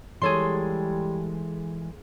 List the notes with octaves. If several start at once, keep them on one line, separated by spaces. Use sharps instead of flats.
E3 G3 G#3 G#4 A4 C#5 C6